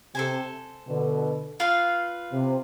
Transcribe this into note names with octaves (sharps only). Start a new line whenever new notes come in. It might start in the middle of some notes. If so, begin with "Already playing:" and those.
C3 A4 C5 G#5
B2 D3
F4 B4 F5
C3